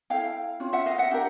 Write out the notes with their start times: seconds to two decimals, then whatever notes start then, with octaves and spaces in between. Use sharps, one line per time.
0.10 E4 A4 F5 G5
0.60 C#4 F4
0.73 E5 F#5
0.86 D#5 F5
0.98 E5 F#5
1.11 D4 G4 A#4